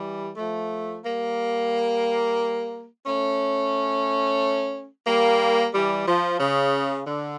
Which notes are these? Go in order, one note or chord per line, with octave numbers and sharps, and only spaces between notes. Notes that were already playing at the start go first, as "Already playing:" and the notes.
Already playing: E3 G3
F3 A3
G3 A#3
A3 C#4
G3 A#3
E3 G3
F3
C#3
D3